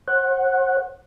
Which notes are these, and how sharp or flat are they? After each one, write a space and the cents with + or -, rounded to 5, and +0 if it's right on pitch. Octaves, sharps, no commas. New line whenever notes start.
C5 +40 F#5 +0